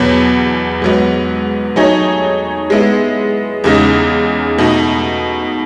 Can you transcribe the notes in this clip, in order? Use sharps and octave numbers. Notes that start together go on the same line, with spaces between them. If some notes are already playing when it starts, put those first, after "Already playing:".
Already playing: E2 B2 F#3 B3
G#2 F#3 B3
F#3 A3 D#4 G#4 C#5
G#3 B3 E4
E2 C#3 G#3 D#4
B2 A3 D#4